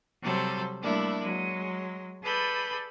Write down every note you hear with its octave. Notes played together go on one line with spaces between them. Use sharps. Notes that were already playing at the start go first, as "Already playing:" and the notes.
C3 F#3 G3 A4 C5
G3 A3 A#3 D4 E4
F#3 G#3
G#4 A4 B4 D5 B5 G6